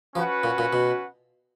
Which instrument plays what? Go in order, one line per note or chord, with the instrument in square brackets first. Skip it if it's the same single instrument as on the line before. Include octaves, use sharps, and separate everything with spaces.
[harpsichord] F3 [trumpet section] C#4 F#4 B4 F#5
[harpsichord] A#2
A#2
B2